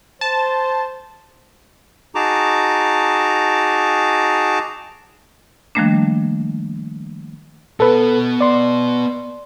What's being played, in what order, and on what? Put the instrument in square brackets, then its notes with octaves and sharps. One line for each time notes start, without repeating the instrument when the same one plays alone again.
[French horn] C5 [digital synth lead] A5
[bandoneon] D#4 F#4 G#4 A5 A#5 D6
[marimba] D#3 F3 G3 A3 A#3 D4
[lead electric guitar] B2 B3 [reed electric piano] A4 B4
[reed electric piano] D5 C6